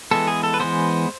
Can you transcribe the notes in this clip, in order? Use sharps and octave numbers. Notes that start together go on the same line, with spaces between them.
E3 G#3 B3 A4
G#4
A4
B4
E3 G#3 B3 C5